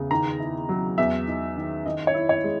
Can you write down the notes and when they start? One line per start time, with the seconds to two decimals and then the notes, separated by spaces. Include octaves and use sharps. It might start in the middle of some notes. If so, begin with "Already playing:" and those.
Already playing: E2 C#3
0.11 D#3 A#5
0.40 E4
0.69 F#3
0.98 E2 E5
1.27 D#4
1.57 D#3
1.86 D#3 D#5
2.07 C#5
2.14 E4
2.29 C#5
2.44 G#3